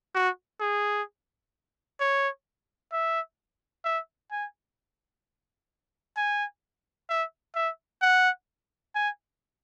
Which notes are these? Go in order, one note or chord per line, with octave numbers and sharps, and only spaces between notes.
F#4
G#4
C#5
E5
E5
G#5
G#5
E5
E5
F#5
G#5